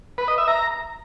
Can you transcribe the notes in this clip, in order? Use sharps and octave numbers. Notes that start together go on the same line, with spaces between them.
B4
D#5
E5
A#5